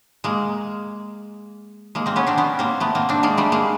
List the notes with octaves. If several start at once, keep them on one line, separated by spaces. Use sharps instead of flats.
G#3 A#3
G#3 A#3
A#3 C4
B3 C#4
C4 D4
B3 C#4
A#3 C4
A3 B3
A#3 C4
C4 D4
G#3 A#3
G3 A3
G#3 A#3